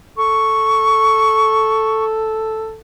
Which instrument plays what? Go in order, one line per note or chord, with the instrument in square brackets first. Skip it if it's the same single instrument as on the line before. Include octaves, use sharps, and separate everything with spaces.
[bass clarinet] A4 [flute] C#6